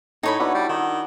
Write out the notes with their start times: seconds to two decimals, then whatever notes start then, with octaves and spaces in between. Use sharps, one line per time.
0.23 A2 D#4 C#5 A5 B5
0.39 B3 D4 E4 F#4
0.55 G3
0.69 D#3 F#5